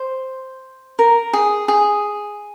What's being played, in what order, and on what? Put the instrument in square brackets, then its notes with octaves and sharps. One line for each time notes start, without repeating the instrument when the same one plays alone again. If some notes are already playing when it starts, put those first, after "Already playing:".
Already playing: [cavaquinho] C5
A#4
G#4
G#4